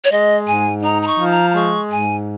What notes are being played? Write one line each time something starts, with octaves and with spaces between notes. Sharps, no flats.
C#5
G#3 D#5
G#2 G#5
D#4 A#5
A#5
C#6
F3
A#5
A#5
G#3 C#6
G#2 G#5